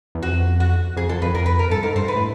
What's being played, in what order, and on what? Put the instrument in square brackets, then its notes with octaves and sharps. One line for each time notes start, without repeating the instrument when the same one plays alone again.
[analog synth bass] E2
[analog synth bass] F2 [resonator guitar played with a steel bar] F#4
[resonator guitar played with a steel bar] F#4
[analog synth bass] F2 [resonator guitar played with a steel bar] G#4
[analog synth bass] F2 [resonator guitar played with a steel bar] A4
[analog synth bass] F2 [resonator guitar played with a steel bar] B4
[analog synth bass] F2 [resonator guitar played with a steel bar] A#4
[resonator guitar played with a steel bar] B4
A#4
[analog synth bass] G2 [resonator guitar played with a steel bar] A4
[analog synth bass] G#2 [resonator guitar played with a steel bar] A#4
[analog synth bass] G2 [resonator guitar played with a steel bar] C5
[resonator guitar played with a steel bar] B4
[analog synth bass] A2